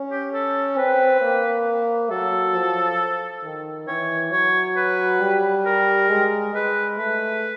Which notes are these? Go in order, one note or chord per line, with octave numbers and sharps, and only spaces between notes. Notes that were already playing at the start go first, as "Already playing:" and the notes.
Already playing: C#4
G4
A4
C4 B4
A#3
F#3 A4
F3
D#3
E3 C#5
F#3 C#5
B4
G3
A#4
G#3
G#3 B4
A3 B4